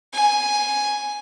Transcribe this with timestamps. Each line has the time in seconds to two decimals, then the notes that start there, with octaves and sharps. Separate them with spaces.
0.14 G#5